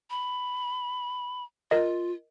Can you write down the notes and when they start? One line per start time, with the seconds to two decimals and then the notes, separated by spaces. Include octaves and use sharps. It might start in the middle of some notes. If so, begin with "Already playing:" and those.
0.10 B5
1.71 F4 A#4 D#5